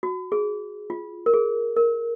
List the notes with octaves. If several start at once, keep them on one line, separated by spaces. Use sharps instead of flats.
F#4
G#4
F4
A#4
G#4
A#4